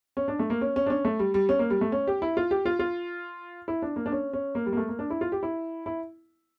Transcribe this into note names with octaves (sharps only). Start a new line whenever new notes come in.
C#4
D4
A3
A#3
C#4
C#4
D4
C#4
A3
G3
G3
C#4
A#3
G3
A3
C#4
G4
E4
F4
G4
F4
F4
E4
D4
A#3
D4
C#4
C#4
A#3
G3
A#3
A3
A#3
D4
E4
F4
G4
E4
E4